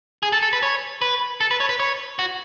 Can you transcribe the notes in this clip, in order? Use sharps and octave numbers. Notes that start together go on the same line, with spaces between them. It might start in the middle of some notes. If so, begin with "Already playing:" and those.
G#4
A4
A4
B4
C#5
B4
A4
B4
C#5
B4
C#5
F#4